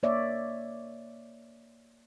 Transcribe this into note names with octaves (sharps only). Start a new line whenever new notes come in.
A#3 C#5 D5 E5